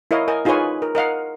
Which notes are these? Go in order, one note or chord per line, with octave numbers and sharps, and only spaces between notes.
E4 A#4 C#5 D#5 F5
A#4 D#5 G#5
D#4 F4 G#4 B4 C#5 G#5
A#4
A#4 D#5 F5 F#5